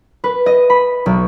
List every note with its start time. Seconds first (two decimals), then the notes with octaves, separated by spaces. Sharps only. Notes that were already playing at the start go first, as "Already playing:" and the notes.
0.24 B4
0.46 D#5
0.70 B5
1.06 B1